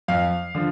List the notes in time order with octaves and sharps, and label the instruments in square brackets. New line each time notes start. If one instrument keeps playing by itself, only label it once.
[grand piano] F2 F5
D3 F3